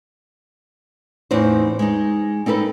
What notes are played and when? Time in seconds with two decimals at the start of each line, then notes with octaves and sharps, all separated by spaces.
1.31 E2 A2 C4 D#4 C5
1.79 G#3 D#4
2.46 C4 D#4 A4 B4